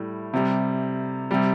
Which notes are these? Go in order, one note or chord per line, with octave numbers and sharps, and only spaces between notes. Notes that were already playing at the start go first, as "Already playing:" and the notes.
Already playing: A2 G3
C3 G3
C3 G3